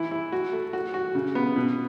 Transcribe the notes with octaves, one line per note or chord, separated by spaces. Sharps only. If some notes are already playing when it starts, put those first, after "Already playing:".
Already playing: E3 E4
E4
F#4
A3
F#4
F#4
C#3
B3
B2